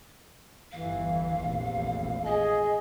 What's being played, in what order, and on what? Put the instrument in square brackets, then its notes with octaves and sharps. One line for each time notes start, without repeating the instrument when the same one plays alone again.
[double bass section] G1 E2 E3 [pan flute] F5
[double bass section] F1 A#1 E2
[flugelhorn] G#4 [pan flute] D#5